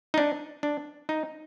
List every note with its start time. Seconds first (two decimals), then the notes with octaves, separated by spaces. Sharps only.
0.14 D#4
0.18 D4
0.63 D4
1.09 D#4